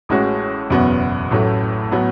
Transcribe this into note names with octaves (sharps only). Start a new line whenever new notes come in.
A1 A2 G#3 C#4 F#4
F#1 E2 B2 F#3 B3
A1 A2 F#3 A3
A2 F#3 B3